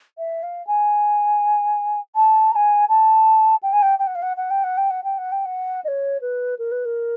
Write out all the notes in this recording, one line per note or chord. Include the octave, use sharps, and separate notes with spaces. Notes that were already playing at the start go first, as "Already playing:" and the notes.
E5
F5
G#5
A5
A#5
G#5
A5
G5
G#5
G5
G5
F#5
F5
F#5
F#5
G5
F#5
G5
F#5
G5
F#5
G5
F#5
D#5
C#5
B4
A#4
B4
A#4